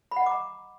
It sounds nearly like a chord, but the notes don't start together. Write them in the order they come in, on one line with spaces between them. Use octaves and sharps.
B5 F#5 D#5 D6 A#5